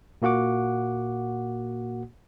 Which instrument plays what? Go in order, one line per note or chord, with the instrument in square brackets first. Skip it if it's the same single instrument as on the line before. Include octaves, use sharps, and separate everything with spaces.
[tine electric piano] A#2 A#3 F#4 F#5 D6